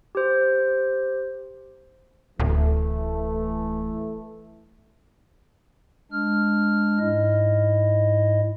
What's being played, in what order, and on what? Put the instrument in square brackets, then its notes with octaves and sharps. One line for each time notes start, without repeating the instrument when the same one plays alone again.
[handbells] G4 C5
[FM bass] D1 [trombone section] E3 A3
[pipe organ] G#3 D4 F6
G#2 E4 D#5